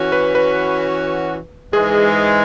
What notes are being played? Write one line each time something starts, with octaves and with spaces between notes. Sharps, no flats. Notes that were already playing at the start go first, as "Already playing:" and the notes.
Already playing: E3 C#4 F#4
B4
B4
G#2 E3 G#3 G#4